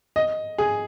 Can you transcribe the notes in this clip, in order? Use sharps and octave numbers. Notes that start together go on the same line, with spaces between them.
D#5
G#4